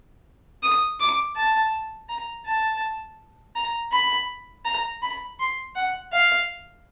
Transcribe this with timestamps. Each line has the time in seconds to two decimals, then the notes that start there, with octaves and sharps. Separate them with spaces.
0.63 D#6
1.00 D6
1.36 A5
2.09 A#5
2.46 A5
3.56 A#5
3.92 B5
4.65 A#5
5.02 B5
5.39 C6
5.75 F#5
6.12 F5